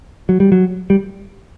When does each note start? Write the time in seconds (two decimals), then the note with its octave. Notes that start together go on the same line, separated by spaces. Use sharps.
0.29 F#3
0.40 G3
0.52 F#3
0.90 G3